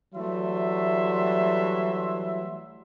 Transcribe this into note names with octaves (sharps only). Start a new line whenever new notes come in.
E3 F#3 G3 A3 E5 C6